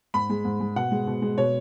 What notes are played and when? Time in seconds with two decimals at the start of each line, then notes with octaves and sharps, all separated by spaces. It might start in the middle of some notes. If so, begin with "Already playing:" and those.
0.14 G#2 B5
0.30 G#3
0.45 G#2
0.60 G#3
0.76 B2 F#5
0.92 G#3
1.07 B2
1.22 G#3
1.38 B2 C#5